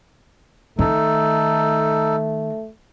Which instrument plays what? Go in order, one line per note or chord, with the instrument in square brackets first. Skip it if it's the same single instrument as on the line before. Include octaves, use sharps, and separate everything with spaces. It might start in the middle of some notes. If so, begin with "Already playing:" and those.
[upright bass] D#3 [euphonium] A3 [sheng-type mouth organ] D#4 A4